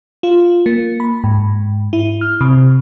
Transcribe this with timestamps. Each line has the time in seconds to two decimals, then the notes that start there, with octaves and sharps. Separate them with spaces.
0.23 F4
0.66 A#3
1.00 B5
1.24 G#2
1.93 E4
2.21 F6
2.41 C3